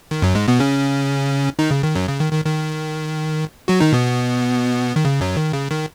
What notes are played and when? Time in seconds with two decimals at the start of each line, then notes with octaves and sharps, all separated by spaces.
0.11 D#3
0.22 F#2 F#3
0.35 G#2 G#3
0.48 B2 B3
0.59 C#3 C#4
1.59 D#3 D#4
1.71 C#3
1.83 D#3
1.95 F#2 F#3
2.08 C#3
2.20 D#3
2.33 D#3
2.45 D#3
3.68 F#3 F#4
3.80 D#3 D#4
3.93 B2 B3
4.96 D#3
5.05 C#3
5.21 F#2 F#3
5.37 D#3
5.53 C#3
5.71 D#3